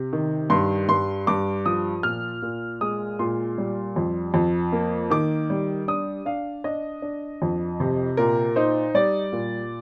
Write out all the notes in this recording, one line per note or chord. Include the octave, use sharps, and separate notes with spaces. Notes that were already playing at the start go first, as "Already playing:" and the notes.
Already playing: C3
D#3
G2 C6
G2 C6
G2 D6
F3 D#6
A#2 F6
A#2
G#3 D#6
A#2 C6
G3
F2
F2
A#3
D#3 D6
G3
D4 D#6
D4 F5
D4 D#5
D4
F2
C3
A#2 A#4
D#4 C5
G3 D5
A#2